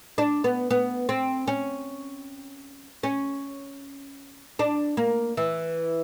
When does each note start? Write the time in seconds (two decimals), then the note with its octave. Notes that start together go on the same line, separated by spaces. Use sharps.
0.18 D4
0.44 B3
0.71 B3
1.09 C4
1.47 C#4
3.03 C#4
4.59 D4
4.97 A#3
5.37 E3